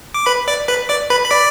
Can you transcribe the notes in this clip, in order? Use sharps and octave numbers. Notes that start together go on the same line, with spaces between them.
D6
B4 B5
D5 D6
B4 B5
D5 D6
B4 B5
B5
D5 D6